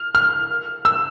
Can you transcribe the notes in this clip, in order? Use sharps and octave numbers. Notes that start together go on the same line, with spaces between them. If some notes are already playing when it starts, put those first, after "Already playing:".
Already playing: F6
F6
E6